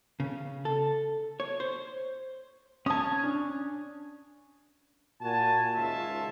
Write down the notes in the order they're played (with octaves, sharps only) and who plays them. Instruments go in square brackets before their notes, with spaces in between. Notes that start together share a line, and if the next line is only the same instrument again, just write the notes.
[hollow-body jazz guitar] C#3
A4
C#5
C5
[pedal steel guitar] C#4 G#5 [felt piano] A5 D#6
[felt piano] D4
[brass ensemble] A#2 F#4 G#5 A5
C#2 D#3 F4 C#5 E5 A5